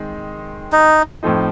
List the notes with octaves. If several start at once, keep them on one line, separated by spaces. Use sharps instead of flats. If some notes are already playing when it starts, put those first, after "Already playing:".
Already playing: D#3 G#3 C4
D#4
A2 F3 A3 C4 D#4